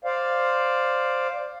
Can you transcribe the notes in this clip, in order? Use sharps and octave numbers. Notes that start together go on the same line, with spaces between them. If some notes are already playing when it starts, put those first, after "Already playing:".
C5 D5 F5